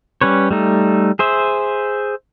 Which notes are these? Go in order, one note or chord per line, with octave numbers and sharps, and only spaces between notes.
G3 C#4 B4 C#5
G3 A3 D#4
G#4 C5 E5